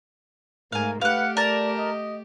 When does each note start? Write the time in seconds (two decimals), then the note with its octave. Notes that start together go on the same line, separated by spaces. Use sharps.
0.72 G#2 A3 A#4 F5 G#5
1.01 A3 G4 B4 F5 F#5
1.37 A#4 D5 A5
1.78 D#5